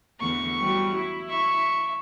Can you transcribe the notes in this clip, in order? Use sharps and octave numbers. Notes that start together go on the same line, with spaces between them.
E2 D3 A3 C#6
E3 F#3 G3
E4
E5 C#6